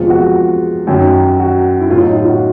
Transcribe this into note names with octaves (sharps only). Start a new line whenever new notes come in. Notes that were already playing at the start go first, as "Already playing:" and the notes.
Already playing: E2 C3 F3 G#3 F4
F#4
F#2 D#3 F#3
F#4
E4
A2 F#3 F4
D#4
F4
F#4